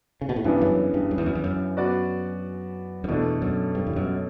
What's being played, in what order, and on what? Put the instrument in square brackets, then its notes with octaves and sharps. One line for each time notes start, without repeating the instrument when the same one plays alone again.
[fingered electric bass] C#3
B2
A2
[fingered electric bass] G2 [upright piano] C#3 E3 B3 D4
[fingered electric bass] F#2
G2
F#2
E2
F#2
E2
F#2
[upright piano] B3 F#4 B4 D5
[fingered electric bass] F#2
[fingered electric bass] E2 [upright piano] B2 A3 D4 A4
[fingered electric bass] F#2
G2
E2
F#2